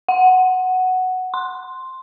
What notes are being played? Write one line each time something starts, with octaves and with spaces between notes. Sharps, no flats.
F#5
C6